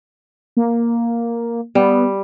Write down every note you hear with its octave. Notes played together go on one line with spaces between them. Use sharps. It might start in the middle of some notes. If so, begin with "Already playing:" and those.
A#3
G3 B3